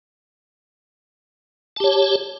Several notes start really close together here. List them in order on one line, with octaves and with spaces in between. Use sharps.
A5 G4 C#5